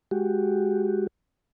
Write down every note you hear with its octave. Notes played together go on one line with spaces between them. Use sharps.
G#3 F#4 G4